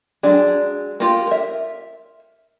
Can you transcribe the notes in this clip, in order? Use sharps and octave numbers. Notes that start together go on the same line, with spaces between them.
F#3 G#3 D4 G#4
A#3 F4 G4
A#4 E5